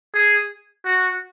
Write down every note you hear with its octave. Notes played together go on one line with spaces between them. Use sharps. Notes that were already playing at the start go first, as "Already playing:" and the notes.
G#4
F#4